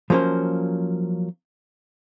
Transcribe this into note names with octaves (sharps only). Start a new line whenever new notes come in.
F3 F#3 A#3 C#4 C5